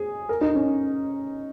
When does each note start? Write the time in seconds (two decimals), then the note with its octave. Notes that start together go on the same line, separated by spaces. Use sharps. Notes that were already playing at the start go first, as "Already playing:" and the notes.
Already playing: G#4
0.29 A#4
0.41 D#4
0.55 C#4